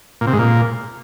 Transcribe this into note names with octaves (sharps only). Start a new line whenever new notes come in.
A#2
C3
G#2
A#2